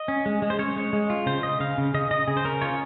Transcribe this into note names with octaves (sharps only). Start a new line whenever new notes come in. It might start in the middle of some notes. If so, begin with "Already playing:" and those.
Already playing: D#5
C#4
G#3
G#3
C5
C#4 C#5
G#3
G#3
F4
C#3 C5
C#3 D#5
C#3 F5
C#3
C#3 D#5
C#3 D#5
C#3 G#4
C5
C#4 A#4
F4 C#5